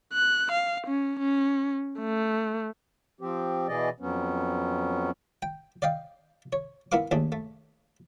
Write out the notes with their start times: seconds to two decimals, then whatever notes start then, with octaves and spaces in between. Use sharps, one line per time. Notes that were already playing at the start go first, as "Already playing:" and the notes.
0.13 F#6
0.52 F5
0.87 C#4
1.20 C#4
2.00 A3
3.21 F3 C4 G4
3.68 B2 E3 G#4 D5 D#5
4.00 F2 F#3 B3 C#4
5.42 G5
5.82 D5 D#5 F5 G5
6.53 C#5
6.92 B3 E4 A#4 F5 D6
7.11 D#2 A3 D4 G#4
7.32 A3